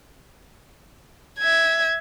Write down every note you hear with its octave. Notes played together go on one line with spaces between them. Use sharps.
E5 G#6